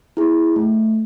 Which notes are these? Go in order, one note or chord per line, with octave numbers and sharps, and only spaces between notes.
E4 G#4
A3